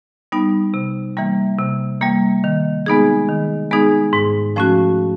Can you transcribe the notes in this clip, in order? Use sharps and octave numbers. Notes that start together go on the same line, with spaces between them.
G3 B3 D#4
C3
E3 G3 A#3
C3
E3 G3 A#3
D#3
G#3 B3 D#4 G#4
D#3
G#3 B3 D#4 G#4
G#2
F3 A3 C#4 F#4